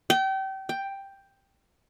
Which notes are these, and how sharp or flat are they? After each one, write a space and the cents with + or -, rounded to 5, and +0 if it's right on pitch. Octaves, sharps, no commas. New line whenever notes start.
G5 -30
G5 +5